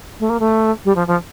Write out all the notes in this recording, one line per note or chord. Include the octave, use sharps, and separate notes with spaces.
A3
A#3
A3
G3
F3
F3